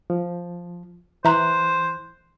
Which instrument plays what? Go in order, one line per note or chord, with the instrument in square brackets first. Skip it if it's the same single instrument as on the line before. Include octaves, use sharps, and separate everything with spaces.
[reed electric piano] F3
[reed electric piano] E3 F#6 [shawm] C5 [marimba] E5 A#5 C6